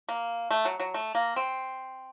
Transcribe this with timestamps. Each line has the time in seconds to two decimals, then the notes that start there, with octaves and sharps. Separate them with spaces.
0.09 A#3
0.51 A3
0.65 F#3
0.80 F#3
0.94 A3
1.15 A#3
1.36 C4